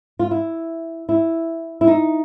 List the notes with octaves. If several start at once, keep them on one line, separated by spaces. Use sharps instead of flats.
F4
E4
E4
E4
D#4